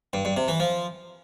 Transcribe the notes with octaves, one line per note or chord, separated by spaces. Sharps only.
G2
G2
C3
E3
F3